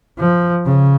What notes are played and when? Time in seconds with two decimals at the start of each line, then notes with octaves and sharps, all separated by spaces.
0.19 F3
0.66 C#3